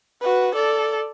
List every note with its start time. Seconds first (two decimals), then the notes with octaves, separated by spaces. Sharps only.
0.21 F#4 B4
0.55 A4 D5